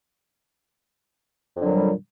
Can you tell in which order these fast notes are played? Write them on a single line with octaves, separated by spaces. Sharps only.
F2 D3 F#3 A#2 G3